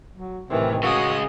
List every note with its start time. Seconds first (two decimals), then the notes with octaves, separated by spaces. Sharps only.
0.18 F#3
0.50 A2 C3 D#3 E3
0.83 C#3 G#3 F#4 D#6